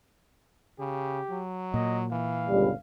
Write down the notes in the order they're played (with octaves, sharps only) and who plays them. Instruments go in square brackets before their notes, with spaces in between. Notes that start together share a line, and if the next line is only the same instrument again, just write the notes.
[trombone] C#3 [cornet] G4
[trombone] F#3
[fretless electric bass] A#2 [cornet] D#5
[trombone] E3 [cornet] F5
[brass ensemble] G1 C#2 G3